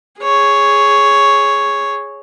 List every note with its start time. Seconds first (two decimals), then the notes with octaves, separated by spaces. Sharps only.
0.20 G#4 C#5